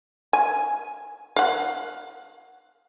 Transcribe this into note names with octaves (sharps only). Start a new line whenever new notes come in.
G#5
F5 F#5